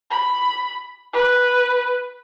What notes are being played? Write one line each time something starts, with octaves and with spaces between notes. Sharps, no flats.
B5
B4